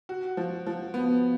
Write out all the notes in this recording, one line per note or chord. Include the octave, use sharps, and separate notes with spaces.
F#4
F3
F3
B3